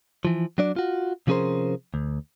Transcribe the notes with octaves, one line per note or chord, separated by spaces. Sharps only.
E3 F3
F#3 D4 D5
F4 F#4
C3 F3 C#4 G#4 A#4 C5
D2